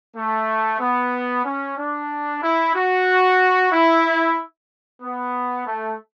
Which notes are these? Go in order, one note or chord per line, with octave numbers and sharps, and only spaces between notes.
A3
B3
C#4
D4
E4
F#4
E4
B3
A3